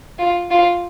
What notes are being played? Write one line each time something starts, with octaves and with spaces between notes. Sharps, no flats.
F4
F4